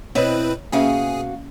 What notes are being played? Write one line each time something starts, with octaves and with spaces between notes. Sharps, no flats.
B2 C4 E4 B4 C#5 D#5
B2 A#3 C#4 F#4 G#4 E5 F5